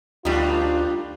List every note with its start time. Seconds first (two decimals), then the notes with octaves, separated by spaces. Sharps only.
0.25 D2 G2 D3 G3 D4 D#4 F4